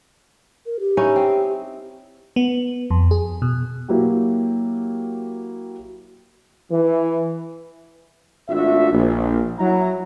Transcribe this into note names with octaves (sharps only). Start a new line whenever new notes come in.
A#4
G4
C#4 D#4 E4
C4
B3
F2
G#4
B2
F#3 A#3 E4 F#4 G4
E3
G#1 A3 D4 F4 F#4 E5
A#1
F#3 E4 A#5